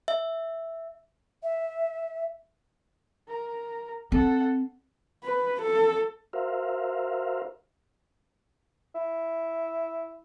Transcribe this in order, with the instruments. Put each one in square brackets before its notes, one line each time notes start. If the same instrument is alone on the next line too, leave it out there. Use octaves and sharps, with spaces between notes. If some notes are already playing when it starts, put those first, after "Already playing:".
[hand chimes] E5
[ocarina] E5
[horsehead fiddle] A#4
[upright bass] C4 [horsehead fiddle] A4 F#5
[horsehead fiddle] B4
A4
[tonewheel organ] F#4 A#4 C5 E5 F5
[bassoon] E4